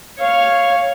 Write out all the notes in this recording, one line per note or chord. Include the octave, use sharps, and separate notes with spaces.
C#5 F5